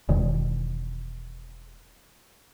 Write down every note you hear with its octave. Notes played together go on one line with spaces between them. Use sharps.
E1 D#3